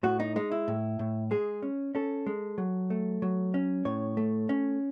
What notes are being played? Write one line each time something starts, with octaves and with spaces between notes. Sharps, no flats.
A2 F#4
D#4
G#3 D#4
E4
A2
A2
G#3 G#4
C#4
C#4 A4
G#3
F#3
A3
F#3
C#4
A2 C#5
A3
C#4